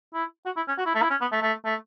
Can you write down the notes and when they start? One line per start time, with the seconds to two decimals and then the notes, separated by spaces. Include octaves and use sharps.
0.14 E4
0.46 F#4
0.57 E4
0.68 C#4
0.78 F#4
0.86 E4
0.95 A3
1.02 E4
1.10 C#4
1.21 B3
1.32 A3
1.42 A3
1.65 A3